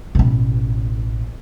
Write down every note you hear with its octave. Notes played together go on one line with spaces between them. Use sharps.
A1 B2